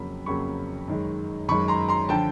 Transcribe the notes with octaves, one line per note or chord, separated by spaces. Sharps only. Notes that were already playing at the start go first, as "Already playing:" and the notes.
Already playing: F2 C#3 F#3 A#3 B5
F2 C#3 F#3 A#3 B5 C#6
F#2 D#3 G#3
F#2 D#3 G#3 B5 C#6
A#5 C6
A#5 C6
D3 F3 G5 A5